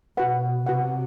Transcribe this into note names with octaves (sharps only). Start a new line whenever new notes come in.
B2 F#4 B4 F#5
C3 F#4 B4 F#5